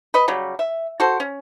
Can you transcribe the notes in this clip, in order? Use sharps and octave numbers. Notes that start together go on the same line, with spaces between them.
B4 D#5
C#3 F#3 G3
E5
F#4 A4 C5
C#4